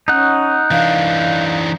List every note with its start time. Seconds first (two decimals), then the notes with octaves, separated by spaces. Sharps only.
0.08 C#4 D#4 F#5
0.71 E3 D4 F5